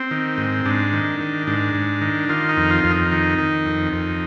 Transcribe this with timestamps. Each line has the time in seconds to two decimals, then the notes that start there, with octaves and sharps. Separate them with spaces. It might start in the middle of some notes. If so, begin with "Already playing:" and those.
Already playing: C4
0.11 D#3
0.38 G#2
0.65 G#2 D4
0.93 D#3
1.21 D#3
1.47 G#2 D4
1.75 G#2
2.01 D#3
2.29 D#3 F4
2.49 D#4
2.57 F2
2.71 F4
2.84 F2
2.91 D#4
3.12 D#3
3.38 D#3
3.66 F2
3.93 F2